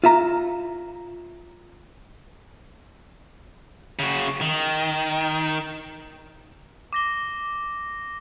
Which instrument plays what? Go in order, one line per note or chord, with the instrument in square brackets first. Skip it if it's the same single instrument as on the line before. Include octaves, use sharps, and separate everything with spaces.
[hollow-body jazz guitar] F4 E5 A#5
[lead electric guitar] C#3 F#4
D#3
[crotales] D6 A#6 G7